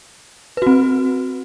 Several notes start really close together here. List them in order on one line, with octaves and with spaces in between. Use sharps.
B4 F#4 C4